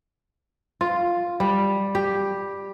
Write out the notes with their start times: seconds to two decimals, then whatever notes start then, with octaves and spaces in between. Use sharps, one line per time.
0.81 F4
1.40 G3
1.95 G4